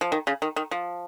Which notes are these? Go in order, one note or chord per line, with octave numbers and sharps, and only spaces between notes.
F3
D#3
C#3
D#3
D#3
F3